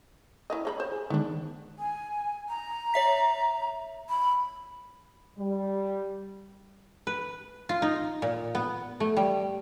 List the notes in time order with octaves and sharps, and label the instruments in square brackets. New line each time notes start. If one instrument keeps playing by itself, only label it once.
[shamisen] E4 A#4 D#5
[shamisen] G#3 A4 B5 [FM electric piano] C#5
[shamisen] C5
[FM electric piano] G#4
[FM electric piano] D3 D#3 G#3 [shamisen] B3 D4
[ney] G#5
A#5
[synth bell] C#5 E5 B6
[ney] B5
[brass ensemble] G3
[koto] B4
F4
D#4
A#2
B3
A3
G3